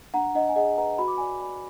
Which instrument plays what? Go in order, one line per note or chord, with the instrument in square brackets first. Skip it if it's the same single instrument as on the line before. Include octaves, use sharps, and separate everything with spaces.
[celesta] D4 F#5 A#5
D4 D#5 F#5
G#5
G#4 D#5 F#5
B4 F#5 A#5
F#4 B5
D6
D5 G#5 B5
D5 G#5 B5